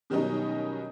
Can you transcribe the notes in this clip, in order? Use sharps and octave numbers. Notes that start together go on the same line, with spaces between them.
B2 D#3 F#3 G3 C#4 D#4